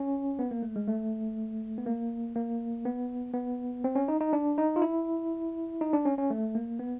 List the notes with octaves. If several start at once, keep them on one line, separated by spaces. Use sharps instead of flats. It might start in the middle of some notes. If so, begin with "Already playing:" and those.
Already playing: C#4
B3
A#3
A3
G#3
A3
B3
A#3
A#3
B3
B3
C4
C#4
D#4
D#4
D4
D#4
F4
E4
D#4
D4
C#4
C#4
A3
A#3
B3